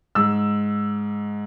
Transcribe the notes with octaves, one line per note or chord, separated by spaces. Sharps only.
G#2 E6